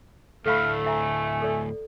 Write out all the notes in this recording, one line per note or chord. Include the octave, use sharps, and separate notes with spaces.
D2 A2 A3 A4 F5 B5 F6
E5 G#5 A#5
A4 D5